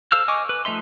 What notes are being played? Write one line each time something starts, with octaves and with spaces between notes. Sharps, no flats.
A4 C5 F5 E6 F6
D#5 G#5 C#6 D6
B4
F3 A3 D#4 E5 C6